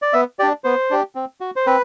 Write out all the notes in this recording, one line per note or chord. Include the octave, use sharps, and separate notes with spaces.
D5
B3 E5
D4 G4 D5
B3 C5
D4 G4
C4
F#4
C5
C4 B4